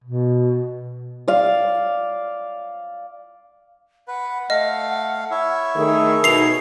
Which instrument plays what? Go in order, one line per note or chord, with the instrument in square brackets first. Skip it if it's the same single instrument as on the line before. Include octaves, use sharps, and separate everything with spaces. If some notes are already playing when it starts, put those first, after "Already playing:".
[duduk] B2
[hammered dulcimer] D5 F5
[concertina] B4 [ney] F#5
[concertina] A3 F5 [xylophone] D#5
[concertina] E4 C#5 E5
[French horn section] D#3 A3 [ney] G#4
[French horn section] B2 D#4 [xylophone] C7 F7